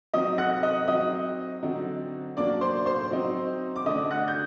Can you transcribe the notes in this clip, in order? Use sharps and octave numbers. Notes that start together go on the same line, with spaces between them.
F#3 C4 D#4 D#5 D#6
F#5 F#6
D#5 D#6
F#3 C4 D#4 D#5 D#6
D3 F#3 C4 D#4
F#3 A#3 D4 D5 D6
C5 C6
C5 C6
F#3 C4 D#4
D6
D3 A3 D4 D#5 D#6
F#5 F#6
G6